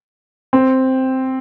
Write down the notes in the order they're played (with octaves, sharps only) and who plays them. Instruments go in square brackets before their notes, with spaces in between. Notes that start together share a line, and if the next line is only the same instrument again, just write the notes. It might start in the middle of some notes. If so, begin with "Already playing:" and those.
[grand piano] C4